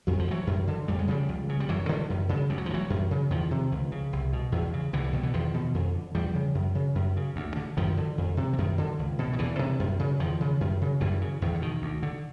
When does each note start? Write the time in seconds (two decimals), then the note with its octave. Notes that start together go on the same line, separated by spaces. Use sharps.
0.07 F2 F#3
0.19 F3
0.28 D3
0.31 E3 F#3
0.47 F#2
0.67 D3
0.88 F2 G3
0.99 G#3
1.08 C#3 F3 G3
1.29 C#2
1.49 C#3
1.60 G3
1.69 F#2 E3 F#3
1.89 D3
2.10 F#2
2.29 C#3
2.50 D2 G3
2.58 F#3
2.66 F3
2.71 C#3
2.74 E3 F#3
2.90 F#2
3.11 C#3
3.30 E2 D#3 F3
3.51 C3
3.72 C#2
3.92 C#3
4.13 C2
4.33 B2
4.52 E2
4.73 C#3
4.93 C2 D3 E3
5.04 D3
5.13 B2 D#3
5.23 D3 E3
5.33 E2 D#3 F3
5.54 B2
5.75 F2
5.94 D3
6.14 E2 F3 G3
6.35 C#3
6.55 F#2
6.75 C#3
6.95 F#2
7.17 C#3
7.36 D2
7.57 D3
7.77 F#2 D#3 F3
7.97 D3
8.18 F2
8.37 C3
8.53 E3
8.58 F#2 D#3
8.78 D3
8.99 C#2
9.19 B2
9.33 D#3
9.39 E2 D3 E3
9.59 C3
9.80 F#2
9.99 C#3
10.19 E2 D#3 F3
10.41 C#3
10.61 F#2
10.81 C#3
11.00 F#2 D3 E3
11.21 C#3
11.42 E2 D#3
11.55 D3
11.62 B2 D#3
11.82 D2
12.03 D3